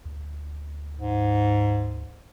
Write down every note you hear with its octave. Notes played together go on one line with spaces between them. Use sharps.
D2
G#2